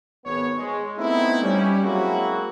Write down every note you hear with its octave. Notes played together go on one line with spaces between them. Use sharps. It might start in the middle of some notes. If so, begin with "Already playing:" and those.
G#1 B3 C#5
G#3
A3 B3 C4 D#4 E4
G3 C#4
F#3 G#3 A#3 C4 E4 F#4